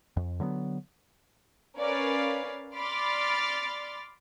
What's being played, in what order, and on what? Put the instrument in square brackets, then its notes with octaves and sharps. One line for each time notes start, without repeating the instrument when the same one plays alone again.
[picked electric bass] F2
D3 F#3 A#3 B3
[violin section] C#4 A#4 B4 D5 F5
D5 B5 C6 D6 F6 A6